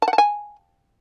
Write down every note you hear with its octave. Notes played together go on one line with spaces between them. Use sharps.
A5
F#5
A5
G#5